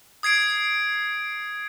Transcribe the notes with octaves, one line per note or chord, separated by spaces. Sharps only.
D#6 G#6 C7 D7